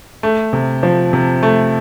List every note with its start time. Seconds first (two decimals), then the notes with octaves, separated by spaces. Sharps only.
0.23 A3
0.53 C3
0.83 F3
1.13 C3
1.43 A3